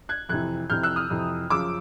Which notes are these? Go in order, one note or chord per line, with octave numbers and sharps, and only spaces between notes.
F#6 G#6
F2 C3 E3 F#6 G#6
F2 C3 E3 F6 G6
E6 F#6
D#6 F6
F2 C3 E3
F#2 C#3 F3 D6 E6